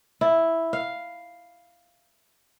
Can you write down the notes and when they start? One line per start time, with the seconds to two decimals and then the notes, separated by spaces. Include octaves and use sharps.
0.21 E4
0.73 F5